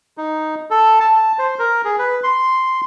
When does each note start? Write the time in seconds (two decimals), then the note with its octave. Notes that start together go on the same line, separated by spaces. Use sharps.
0.18 D#4
0.71 A4
1.00 A5
1.38 C5
1.59 A#4
1.85 G#4
1.99 B4
2.24 C6